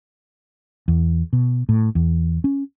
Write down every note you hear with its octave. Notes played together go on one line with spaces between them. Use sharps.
E2
B2
A2
E2
C#4